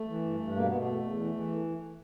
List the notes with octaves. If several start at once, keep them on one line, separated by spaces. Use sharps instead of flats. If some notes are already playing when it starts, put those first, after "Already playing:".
Already playing: A3
E3
G2
G2
B2 A#3
B3
B2 A#3
A3
E2
E2
E3
E3